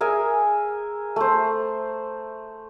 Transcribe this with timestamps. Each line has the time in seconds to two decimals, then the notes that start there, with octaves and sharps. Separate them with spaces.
0.01 G#4 A#4 E5 G#5
1.16 A3 C5